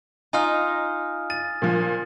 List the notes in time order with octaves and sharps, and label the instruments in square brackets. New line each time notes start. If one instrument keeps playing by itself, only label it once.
[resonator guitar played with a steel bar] D#4 F4 [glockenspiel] G#5 D#6 F6
[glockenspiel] A6 [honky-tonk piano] D#7
[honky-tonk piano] A#2 F3